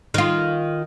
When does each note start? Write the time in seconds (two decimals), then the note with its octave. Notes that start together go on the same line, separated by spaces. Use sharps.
0.14 D#3 F4